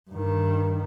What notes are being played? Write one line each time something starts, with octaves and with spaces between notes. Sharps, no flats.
G2 D#3